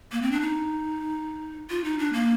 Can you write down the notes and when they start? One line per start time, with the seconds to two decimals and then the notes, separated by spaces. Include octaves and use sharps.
0.12 A#3
0.22 C4
0.31 D4
0.41 D#4
1.70 F4
1.84 D#4
1.99 D4
2.13 A#3